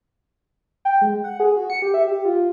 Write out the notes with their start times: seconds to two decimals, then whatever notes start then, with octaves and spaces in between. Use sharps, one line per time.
0.85 G5
1.01 G#3
1.24 F#5
1.40 G#4
1.56 F#4
1.70 C#7
1.82 G4
1.94 E5
2.07 G4
2.25 F4